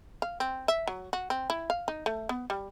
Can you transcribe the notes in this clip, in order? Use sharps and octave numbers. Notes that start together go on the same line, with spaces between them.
F5
C4
E5
F#3
F#4
C4
E4
F5
D#4
A3
B3
G3